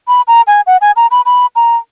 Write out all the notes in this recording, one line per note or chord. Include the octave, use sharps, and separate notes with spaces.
B5
A#5
G#5
F#5
G#5
A#5
B5
B5
A#5